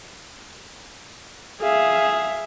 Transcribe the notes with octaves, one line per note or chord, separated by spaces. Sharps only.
G#4 E5 F5